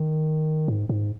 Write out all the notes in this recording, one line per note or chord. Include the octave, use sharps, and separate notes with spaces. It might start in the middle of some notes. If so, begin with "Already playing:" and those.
Already playing: D#3
G#2
G#2